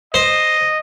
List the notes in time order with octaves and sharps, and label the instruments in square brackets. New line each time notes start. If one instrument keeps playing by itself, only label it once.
[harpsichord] C5 [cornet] D#5